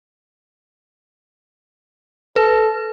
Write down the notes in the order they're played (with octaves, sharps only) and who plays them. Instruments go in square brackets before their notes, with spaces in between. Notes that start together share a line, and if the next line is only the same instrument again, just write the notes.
[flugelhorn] A4 [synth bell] B4